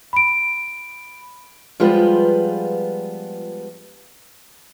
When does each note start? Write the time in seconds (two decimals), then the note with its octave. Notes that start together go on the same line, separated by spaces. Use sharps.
0.13 B5 D7
1.80 F3 G3 G#3 B3 F4 B4